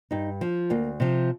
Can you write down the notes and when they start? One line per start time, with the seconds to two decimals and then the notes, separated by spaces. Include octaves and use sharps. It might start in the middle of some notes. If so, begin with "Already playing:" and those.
0.11 G2 D#4
0.41 F3
0.70 D2 A#3
1.00 C3 F3